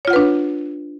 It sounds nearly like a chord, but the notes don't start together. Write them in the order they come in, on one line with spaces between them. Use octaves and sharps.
C#5 F4 F#5 B4 D4